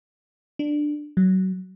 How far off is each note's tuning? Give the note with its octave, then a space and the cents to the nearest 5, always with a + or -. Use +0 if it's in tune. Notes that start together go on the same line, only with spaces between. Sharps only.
D4 +10
F#3 +25